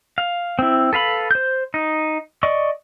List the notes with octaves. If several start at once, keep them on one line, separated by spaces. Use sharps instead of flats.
F5
C4 E4
A4 B4 F5 B5
C5 G6
D#4
D5 D#5 C#6